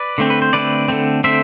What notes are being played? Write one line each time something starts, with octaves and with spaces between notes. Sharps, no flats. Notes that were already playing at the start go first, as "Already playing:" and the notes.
Already playing: B4 D5
D3 A3 C4
B4
C5
D3 A3 C4 B4 D5
D3 A3 C4
D3 A3 C4 C5 E5